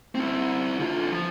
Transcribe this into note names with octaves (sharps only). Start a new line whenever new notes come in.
C4 E4
D3 F4
F3